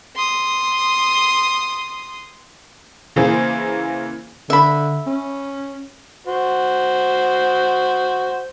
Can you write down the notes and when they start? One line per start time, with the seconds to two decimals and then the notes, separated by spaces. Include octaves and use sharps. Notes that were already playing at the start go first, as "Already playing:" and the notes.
0.16 C6 D#6
3.16 C#3 E3 A#3 G#4 C5
4.50 D3 E5 B5
5.07 C#4
6.27 F#4 C5